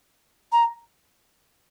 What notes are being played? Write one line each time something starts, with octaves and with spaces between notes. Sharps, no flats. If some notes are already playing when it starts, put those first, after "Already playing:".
A#5